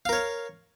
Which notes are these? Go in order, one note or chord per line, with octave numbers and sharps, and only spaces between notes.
A#4 C#5 F5